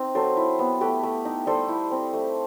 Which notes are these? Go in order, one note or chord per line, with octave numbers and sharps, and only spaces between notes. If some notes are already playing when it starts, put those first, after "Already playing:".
Already playing: C4 D#4
F#3 A4 C5
E4
B3
A3 G4 B4
A3
D#4
G3 A4 C5
E4
C4
A3